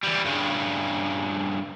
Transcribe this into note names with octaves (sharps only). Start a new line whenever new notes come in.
E3 G3
G2 C#3